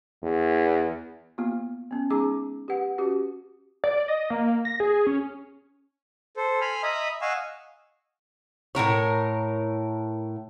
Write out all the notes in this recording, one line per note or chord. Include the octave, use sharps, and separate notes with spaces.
E2
A#3 B3 F4
B3 C#4
G#3 C#4 D#4 G#4 A#5 D6
G4 B4 F#5
C#4 F#4 G4 B4
D5
D#5
A#3
A#6
G#4
C#4
A4 C5
G#5 B5 C6 F6
D#5 E5 A#5 B5 D#6
D#5 F5 F#5 G#5 C#6 E6
A2 E3 A#4 C#5